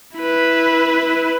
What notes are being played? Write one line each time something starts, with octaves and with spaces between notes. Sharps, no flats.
E4 B4